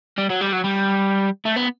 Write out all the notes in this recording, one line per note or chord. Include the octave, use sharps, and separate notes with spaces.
G3
F#3
G3
F#3
G3
A3
B3